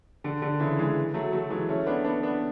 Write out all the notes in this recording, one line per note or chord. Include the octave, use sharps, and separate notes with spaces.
D3
D3
C#3 E3
E3 G#3
F#3 A3
F#3 A3
E3 G#3
A3 C#4
B3 D4
B3 D4
B3 D4